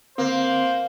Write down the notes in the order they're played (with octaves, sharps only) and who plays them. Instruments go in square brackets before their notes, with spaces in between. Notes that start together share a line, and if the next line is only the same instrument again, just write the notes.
[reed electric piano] D3 C4 [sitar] A#3 [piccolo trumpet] C5